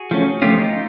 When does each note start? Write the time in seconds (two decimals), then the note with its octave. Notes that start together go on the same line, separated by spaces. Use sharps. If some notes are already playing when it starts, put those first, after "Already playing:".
Already playing: F#4 G#4
0.11 F3 A3 C#4
0.42 F3 A3 C#4 F4 G4
0.58 D#4 F4